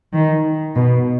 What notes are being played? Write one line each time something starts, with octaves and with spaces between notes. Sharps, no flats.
D#3
B2